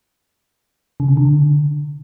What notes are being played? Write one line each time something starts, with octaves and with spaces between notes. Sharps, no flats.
C#3
C3
D3